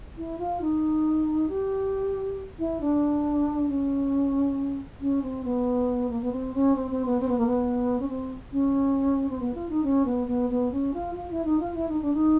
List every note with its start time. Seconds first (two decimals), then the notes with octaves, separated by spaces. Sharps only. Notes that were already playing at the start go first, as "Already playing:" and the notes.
0.17 E4
0.39 F4
0.61 D#4
1.49 G4
2.59 E4
2.81 D4
3.69 C#4
5.00 C#4
5.22 C4
5.44 B3
6.10 A#3
6.21 B3
6.32 C4
6.54 C#4
6.76 C4
6.91 C4
7.05 B3
7.20 C4
7.29 B3
7.38 A#3
7.46 B3
8.00 C#4
8.09 C4
8.52 C#4
9.29 C4
9.40 B3
9.54 F4
9.69 D#4
9.84 C#4
10.05 B3
10.27 B3
10.50 B3
10.72 C#4
10.94 F4
11.15 F4
11.31 E4
11.45 D#4
11.60 F4
11.74 E4
11.89 D#4
12.01 D4
12.14 D#4